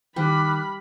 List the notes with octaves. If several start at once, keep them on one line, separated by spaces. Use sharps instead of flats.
D#3 G3 B5 D6 F6 F#6